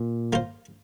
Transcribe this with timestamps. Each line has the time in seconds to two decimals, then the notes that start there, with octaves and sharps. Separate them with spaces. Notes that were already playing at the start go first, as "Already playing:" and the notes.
Already playing: A#2
0.33 A#3 F4 C5